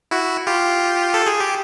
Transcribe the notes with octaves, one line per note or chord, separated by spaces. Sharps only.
E4 F#4
F4 G4
A4
G#4
G4